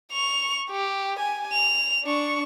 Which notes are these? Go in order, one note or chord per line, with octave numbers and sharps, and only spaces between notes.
C#6 F7
G4
G#5
F7
D4 C#6